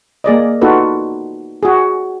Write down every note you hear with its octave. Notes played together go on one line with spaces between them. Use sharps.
A#3 G#4 D5 D#5
B3 D#4 F4 F#4 A4 B4
F#4 G#4